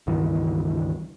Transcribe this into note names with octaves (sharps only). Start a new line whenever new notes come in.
C#2 G2 D#3 E3